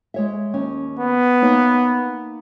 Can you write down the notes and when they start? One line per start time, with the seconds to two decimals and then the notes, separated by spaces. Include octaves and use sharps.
0.14 G#3 C#5 E5
0.54 D#2 C#4
0.99 B3
1.42 A#3 D#4 C#5